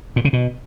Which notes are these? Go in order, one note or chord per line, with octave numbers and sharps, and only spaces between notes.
A#2
C#3
B2